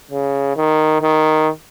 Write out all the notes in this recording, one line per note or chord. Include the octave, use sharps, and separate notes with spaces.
C#3
D#3
D#3